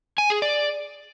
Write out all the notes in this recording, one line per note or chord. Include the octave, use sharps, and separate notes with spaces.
G#5
G#4
D5